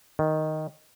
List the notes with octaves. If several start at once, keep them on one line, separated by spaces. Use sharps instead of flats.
D#3